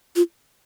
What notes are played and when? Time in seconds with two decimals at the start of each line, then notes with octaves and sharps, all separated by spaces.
0.16 F4